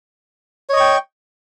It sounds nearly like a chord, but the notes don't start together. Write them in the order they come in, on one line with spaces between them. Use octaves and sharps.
C#5 D#5 C#6 G5